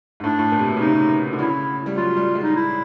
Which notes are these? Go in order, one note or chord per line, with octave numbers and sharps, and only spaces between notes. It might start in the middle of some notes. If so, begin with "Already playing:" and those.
G#2
A2 D4
A2
A#2
C3
B2
C#3
C3 D#4
D3
C#3 E4
G3
F#3 F4
G3
G#3
D#4
E4